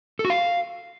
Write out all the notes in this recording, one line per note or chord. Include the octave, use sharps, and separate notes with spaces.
A4
F#4
F5